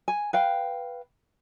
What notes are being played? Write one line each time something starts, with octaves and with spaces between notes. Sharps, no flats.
G#5
B4 F5 G5